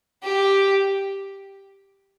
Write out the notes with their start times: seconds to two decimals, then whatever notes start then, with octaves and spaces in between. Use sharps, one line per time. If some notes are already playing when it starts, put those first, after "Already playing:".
0.23 G4